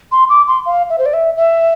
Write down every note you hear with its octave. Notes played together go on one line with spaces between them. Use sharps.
C6
D6
C6
F5
E5
C5
D5
E5
E5